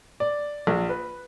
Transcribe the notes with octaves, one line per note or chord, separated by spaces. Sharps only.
D5
A#1
B4